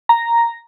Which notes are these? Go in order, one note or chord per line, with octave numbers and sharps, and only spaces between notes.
A#5